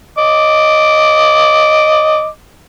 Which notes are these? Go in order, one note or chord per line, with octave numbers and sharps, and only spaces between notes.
D#5 D6